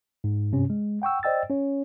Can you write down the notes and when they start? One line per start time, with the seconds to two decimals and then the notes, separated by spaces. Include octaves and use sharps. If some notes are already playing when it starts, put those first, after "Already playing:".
0.24 G#2
0.52 G2 C3 C#4
0.70 G#3
1.02 F#5 G5 C#6 E6
1.23 C5 D5 D#5 G5 E6 A6
1.50 C#4 C#5